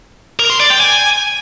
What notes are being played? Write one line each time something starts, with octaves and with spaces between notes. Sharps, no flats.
A#4
C6
D5
G5
G#5